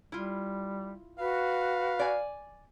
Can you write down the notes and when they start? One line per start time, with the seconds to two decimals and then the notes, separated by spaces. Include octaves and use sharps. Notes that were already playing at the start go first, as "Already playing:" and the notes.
0.12 G3 E4 F4
1.19 F#4 B4 F5
1.99 D5 G#5